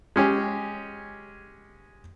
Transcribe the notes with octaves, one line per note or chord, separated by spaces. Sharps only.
G#3 C#4 G4